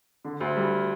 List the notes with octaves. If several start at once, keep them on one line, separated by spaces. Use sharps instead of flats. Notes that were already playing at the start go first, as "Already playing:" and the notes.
D3
D2
G3